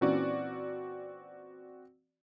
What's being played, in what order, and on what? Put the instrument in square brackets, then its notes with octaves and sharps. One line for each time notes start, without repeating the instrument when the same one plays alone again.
[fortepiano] A#2 E3 C#4 [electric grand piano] C4 F#4 D5